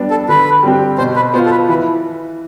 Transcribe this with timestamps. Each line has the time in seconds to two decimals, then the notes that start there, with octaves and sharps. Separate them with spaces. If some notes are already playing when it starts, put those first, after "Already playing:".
Already playing: G3 B3 D4
0.10 A4
0.28 D3 B4
0.63 G3 C4 G4
0.98 B2 C5
1.16 B4
1.34 B3 C5
1.38 F4
1.45 A4
1.51 B4
1.69 E3 B4